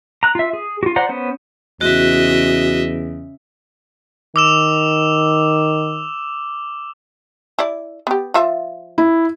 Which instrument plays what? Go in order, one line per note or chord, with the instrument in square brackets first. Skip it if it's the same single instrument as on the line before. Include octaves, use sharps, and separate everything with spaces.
[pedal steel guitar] A#5 F#6
F4 E5
G#4
F4 F#4
C5 D5 F#5 A#5
B3 C#4 C5
[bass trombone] E2 [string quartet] C#3 [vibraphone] F#4 [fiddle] D#5 E5
[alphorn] D#3 [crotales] D6 E6 E7
[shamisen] E4 D5
B3 G4
F3 F4 E5
[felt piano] E4